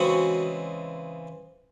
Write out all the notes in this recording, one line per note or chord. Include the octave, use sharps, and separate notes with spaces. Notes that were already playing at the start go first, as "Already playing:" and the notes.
Already playing: C#3 E3 G#3 C4 F#4 F#5